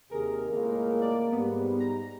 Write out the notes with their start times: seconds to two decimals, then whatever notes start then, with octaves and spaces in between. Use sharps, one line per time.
0.11 D#2 C3 G#4 A#4
0.50 C#2 A2 G#3 A#3
1.02 D5
1.32 G#2 G3 B3
1.80 A#5